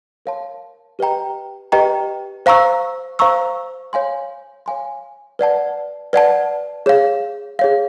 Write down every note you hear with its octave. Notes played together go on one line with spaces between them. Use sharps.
A#4 C#5 F5 A5 C6
G4 B4 D#5 G5 A#5
G4 B4 D#5 G5 A#5
C5 F5 A#5 C#6 E6
C5 F5 A#5 C#6 E6
C#5 F5 G#5 C6
C#5 F5 G#5 C6
B4 D5 F#5 A5
B4 D5 F#5 A5
G#4 C#5 F5
G#4 C#5 F5